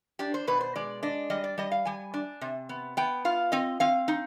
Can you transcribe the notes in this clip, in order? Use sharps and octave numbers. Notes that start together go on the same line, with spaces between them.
D4 G4
C5
B2 B4
C5
G#3 D5
D4 D#5
G3 D#5
D5
G3 D#5
F5
G3 G#5
D4
C3
B3
B3 G5
F4 F5
C4 D#5
C4 F5
D#4